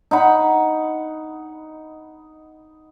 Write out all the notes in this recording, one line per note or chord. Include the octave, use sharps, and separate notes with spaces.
D#4 F#5 B5